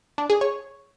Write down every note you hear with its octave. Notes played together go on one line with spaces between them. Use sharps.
D4
G#4
C#5